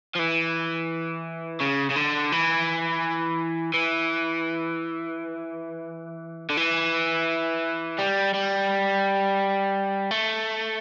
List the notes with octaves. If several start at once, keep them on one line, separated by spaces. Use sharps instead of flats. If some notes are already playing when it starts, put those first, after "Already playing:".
F3
E3
C#3
C#3
D3
E3
E3
D3
E3
G3
G3
A3